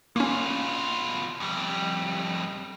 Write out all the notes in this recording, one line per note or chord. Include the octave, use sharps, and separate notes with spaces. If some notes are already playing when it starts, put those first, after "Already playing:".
B2 A#3 C#4 F4
F2 G3